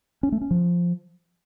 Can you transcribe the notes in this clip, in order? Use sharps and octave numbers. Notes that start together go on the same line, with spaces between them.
C#4
A3
C#4
F3